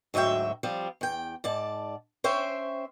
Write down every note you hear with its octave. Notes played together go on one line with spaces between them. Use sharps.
D2 G#2 F#3 E5 G5
F3 G3 C4
E2 G5
G#2 D5 A5
C#4 C5 E5 G5